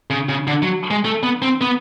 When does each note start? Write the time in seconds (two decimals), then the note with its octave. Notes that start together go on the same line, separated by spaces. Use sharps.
0.10 C#3
0.29 C#3
0.47 D3
0.62 F#3
0.91 G#3
1.05 A3
1.23 B3
1.42 C4
1.61 B3